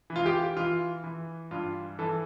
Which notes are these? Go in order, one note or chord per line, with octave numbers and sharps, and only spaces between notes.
E3
F4
G4
E3 F4
E3
G2 F4
E3 A4